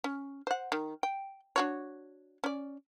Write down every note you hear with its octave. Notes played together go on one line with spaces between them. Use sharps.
C#4
C5 F#5
D#3
G5
D4 F#4 C#5
C#4 D5